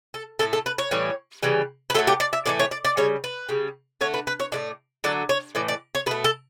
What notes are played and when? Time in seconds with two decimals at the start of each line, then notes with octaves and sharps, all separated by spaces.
0.14 A4
0.39 A2 E3 A3 A4
0.53 A4
0.66 B4
0.78 C#5
0.91 A2 E3 G3
1.43 C#3 E3 G3
1.90 B4
1.94 A2 F#3 A3 A4
2.07 G4
2.20 D5
2.33 E5
2.46 A2 E3 A3 D5
2.59 C#5
2.71 D5
2.85 D5
2.97 C#3 G3 C#5
3.24 B4
3.49 C#3 G3
4.01 D3 A3 C#5
4.14 B4
4.27 B4
4.40 C#5
4.52 A2 F#3 A3 D5
5.04 D3 F#3 A3 D5
5.29 C#5
5.55 A2 E3 D5
5.68 D5
5.95 C#5
6.06 B2 B4
6.11 A3
6.24 A4